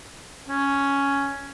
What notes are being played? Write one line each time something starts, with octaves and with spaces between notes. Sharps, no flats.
C#4